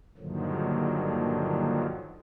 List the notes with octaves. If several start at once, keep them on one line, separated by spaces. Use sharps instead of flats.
G2 A#2 D3 D#3 F3 F#3